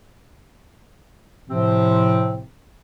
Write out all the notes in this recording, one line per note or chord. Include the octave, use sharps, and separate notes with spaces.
A2 C3 F3 C4